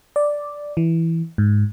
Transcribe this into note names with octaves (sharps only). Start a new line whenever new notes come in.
D5
E3
G#2